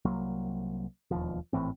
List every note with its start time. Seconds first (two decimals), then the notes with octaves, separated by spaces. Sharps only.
0.05 C2 F#3 A#3
1.11 E1 D#2 F3
1.53 G#1 A2 E3 C4